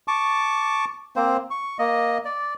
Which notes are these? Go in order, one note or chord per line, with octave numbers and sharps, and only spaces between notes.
A5 C#6 D6
A#3 C4 C5
C#6
A#3 D#5
D5